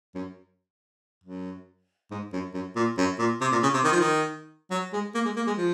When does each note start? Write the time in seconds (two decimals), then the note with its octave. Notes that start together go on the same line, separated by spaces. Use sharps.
0.15 F#2
1.24 F#2
2.11 G#2
2.33 F#2
2.54 F#2
2.76 A#2
2.98 F#2
3.19 A#2
3.41 C3
3.52 A#2
3.63 C#3
3.74 C3
3.84 D#3
3.92 F3
4.00 D#3
4.71 F#3
4.93 G#3
5.14 A#3
5.25 G#3
5.36 A#3
5.47 G#3
5.58 F3